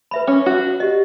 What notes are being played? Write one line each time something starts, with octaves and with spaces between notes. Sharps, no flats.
B4 E5 B5
C#4
F#4
F#5
G4 D#5